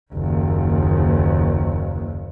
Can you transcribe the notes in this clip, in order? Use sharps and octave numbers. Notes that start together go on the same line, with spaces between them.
F#1 D#2